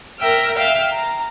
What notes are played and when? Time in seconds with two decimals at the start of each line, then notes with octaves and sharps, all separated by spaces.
0.19 A#4 E5 G5 F6
0.55 E5 F5 G5
0.92 A#5